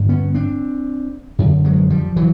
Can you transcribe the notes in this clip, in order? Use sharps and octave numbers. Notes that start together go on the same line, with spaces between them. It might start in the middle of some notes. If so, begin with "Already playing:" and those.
Already playing: G2 D3
B3 C#4
C4 D4
F#2 D3
F#3 G#3
F3 G3
E3 F#3